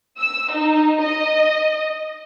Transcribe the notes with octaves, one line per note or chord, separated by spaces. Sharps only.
E6
D#4
D#5